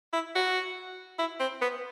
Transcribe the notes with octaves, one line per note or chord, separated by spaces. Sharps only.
E4
F#4
E4
C4
B3